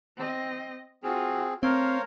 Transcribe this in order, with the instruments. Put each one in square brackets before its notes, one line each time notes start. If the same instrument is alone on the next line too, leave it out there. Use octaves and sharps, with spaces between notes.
[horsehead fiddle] C4 D#5
[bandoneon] C4 G#4 [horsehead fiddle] F4 F#4
[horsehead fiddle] A3 A#4 [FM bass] C4 [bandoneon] C5 C#5 F5